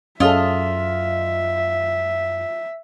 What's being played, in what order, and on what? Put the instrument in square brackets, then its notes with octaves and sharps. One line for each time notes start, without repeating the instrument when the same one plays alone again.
[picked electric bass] F#2 [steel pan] C#4 G#4 A4 [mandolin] F4 D#5 [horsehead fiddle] E5